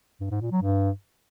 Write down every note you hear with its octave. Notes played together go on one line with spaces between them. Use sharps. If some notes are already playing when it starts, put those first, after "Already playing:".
G2
G#2
A#2
F#3
G2